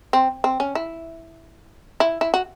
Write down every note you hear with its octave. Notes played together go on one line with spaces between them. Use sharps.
C4
C4
C#4
E4
E4
E4
F#4